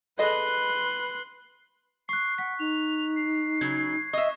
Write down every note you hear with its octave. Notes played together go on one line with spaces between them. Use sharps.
G#4 A4 B4 D#5 C6 F#6
C#6 F#6 C7
F#5 B6
D#4 F7
C7
C#3 F#3 G#6
D#5 E5 C#6